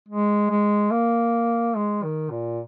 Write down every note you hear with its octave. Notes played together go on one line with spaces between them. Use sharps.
G#3
G#3
A#3
G#3
D#3
A#2